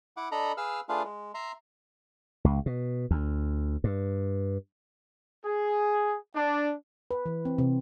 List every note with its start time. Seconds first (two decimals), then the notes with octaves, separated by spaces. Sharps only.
0.17 E4 F#5 D6
0.32 D4 A4 D#5 A#5 B5
0.57 G#4 B4 F5 E6 F6
0.89 A3 D4 F4 G#4 B4 F5
1.04 G#3
1.34 E5 A#5 C6
2.45 C#2
2.66 B2
3.11 D2
3.84 G2
5.45 G#4
6.35 D4
7.11 B4
7.26 E3
7.45 C4
7.58 C3